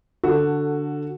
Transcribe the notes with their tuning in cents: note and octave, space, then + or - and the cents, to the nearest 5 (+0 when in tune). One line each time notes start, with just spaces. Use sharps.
D3 +0 F#4 +0 A4 +15